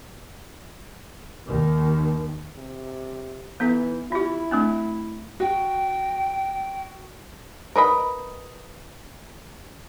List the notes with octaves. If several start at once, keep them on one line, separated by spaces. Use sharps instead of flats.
D#2 D#3
C3
E3 B3 D#4 A4
E4 F4 G4
A3 C4 D4
F#4 G5
A#4 B4 D#5 B5